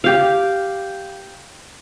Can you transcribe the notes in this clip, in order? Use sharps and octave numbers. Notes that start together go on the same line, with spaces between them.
G4 F5